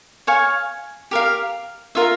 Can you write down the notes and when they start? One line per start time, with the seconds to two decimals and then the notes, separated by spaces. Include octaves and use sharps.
0.27 C#5 F5 G#5 C#6
1.11 G4 A#4 F5
1.95 F4 A#4 E5